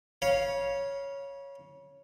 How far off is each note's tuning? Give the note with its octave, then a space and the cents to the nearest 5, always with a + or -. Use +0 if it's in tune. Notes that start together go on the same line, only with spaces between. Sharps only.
C#5 +0 F5 +0 B5 -35